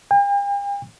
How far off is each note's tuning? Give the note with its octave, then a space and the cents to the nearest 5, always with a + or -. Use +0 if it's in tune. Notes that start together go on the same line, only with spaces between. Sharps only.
G5 +45